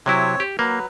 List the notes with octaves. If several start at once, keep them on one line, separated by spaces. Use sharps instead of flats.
C3 F#3 C4 E4 C#5
G4
F#3 A#3 B4